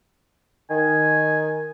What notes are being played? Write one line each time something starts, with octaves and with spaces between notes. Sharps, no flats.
D#3 G#5